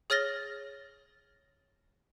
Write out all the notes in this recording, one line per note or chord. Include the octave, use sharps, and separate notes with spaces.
G#4 C#5 F6 A6 A#6 G7